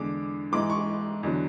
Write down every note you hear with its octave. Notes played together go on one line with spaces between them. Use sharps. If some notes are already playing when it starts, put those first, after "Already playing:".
Already playing: E2 D3 G#3 D6
G#2 E3 G#3 D6
C#6
E2 D3 F#3